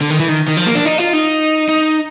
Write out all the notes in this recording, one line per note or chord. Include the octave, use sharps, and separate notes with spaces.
D3
D#3
E3
D#3
D#3
F3
A#3
D4
D#4
F4
D#4
D#4